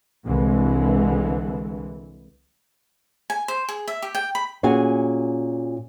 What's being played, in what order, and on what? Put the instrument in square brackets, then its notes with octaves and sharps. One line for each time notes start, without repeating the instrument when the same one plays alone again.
[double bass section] C2 D3 E3 G#3
[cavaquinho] G#5
C5
G#4
E5
G4
G5
B5
[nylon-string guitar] A#2 C#4 F#4 G#4 G#5